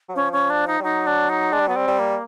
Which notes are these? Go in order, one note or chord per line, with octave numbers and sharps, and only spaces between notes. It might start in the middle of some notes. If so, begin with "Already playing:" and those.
F#3
F3 C#4
C#4
D4
D#4
G3
F#3 D#4
D4
D#4
G#3 D4
G3
F#3 B3
G3 C4
G3
A#3